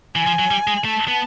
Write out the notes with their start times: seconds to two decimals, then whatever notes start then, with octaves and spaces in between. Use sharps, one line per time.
0.16 E3 G#5
0.27 F3
0.39 F#3
0.51 G3
0.67 G#3
0.85 A3 A5
1.08 B3